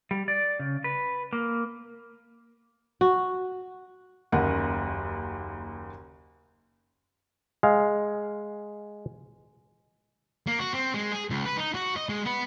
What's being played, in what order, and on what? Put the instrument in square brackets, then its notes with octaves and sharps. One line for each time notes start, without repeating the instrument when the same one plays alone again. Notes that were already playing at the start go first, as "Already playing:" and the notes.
[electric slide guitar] G3
D5
C#3
B4
A#3
[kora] F#4
[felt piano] F#1 D#2 F#5
[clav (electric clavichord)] G#3 F5
[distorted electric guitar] A#3
F#4
C4
G#3
G#4
C#2
B4
D#4
F#4
D#5
G#3
B3